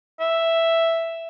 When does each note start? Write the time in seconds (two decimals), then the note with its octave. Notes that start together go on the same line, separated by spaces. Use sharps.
0.20 E5